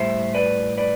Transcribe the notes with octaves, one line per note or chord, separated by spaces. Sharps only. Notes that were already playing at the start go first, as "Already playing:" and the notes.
Already playing: A2 G3 C5 E5
B4 D5
B4 D5